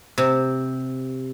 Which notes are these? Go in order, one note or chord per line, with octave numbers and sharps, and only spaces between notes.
C3